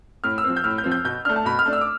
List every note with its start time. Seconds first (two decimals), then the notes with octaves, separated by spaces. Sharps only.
0.24 A2 F6
0.38 E6
0.44 F3 C4
0.56 G6
0.64 A2 F6
0.78 G6
0.84 F3 C4
0.92 G6
1.04 B2 G6
1.25 A3 D4 F6
1.36 A5
1.45 B2 B5
1.59 F6
1.65 A3 D4
1.73 E6
1.81 D6